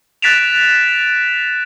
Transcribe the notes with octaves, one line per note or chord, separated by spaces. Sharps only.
F#6 A6 B6 D7 E7 F7